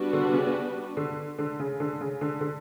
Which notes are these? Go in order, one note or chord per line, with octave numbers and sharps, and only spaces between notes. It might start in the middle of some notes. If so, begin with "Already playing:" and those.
Already playing: G3 B3 D4 F#4 B4
D3
C#3
D3
D3
C#3
D3
C#3
D3
D3